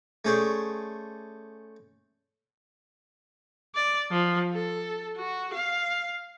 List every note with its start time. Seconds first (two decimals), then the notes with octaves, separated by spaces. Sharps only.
0.25 A3 C#4 G#4 C5 D5
3.75 D5
4.10 F3
4.52 A4
5.17 F#4
5.54 F5